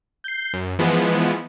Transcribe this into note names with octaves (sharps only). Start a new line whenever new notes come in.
G6 C7
F#2
E3 F3 G#3 B3